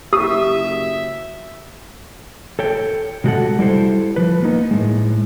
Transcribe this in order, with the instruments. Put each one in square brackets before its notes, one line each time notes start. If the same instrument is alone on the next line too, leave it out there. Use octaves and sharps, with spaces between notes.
[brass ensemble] F#1 E5 [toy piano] G4 [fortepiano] D#6
[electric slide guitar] A4 C#5 G5
C3 G#3 F#4 G4 A4 F#5
G3 E4 A4 C5
F3 B4
A#3 B3 D#4
A2 G#3